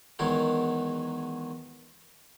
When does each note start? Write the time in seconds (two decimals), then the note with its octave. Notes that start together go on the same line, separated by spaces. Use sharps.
0.19 E2 D#3 F#3 G#3 G#4 A#4